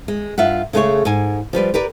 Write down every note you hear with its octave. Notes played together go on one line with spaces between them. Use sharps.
G#3
G2 F4 E5 F#5
C#3 G#3 A3 G#4 C5 C#5
G#2 G#5
F3 G3 B4 D5
G4 A#4 B4 D5